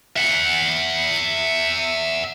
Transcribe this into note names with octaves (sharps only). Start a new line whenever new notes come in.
E5 F#5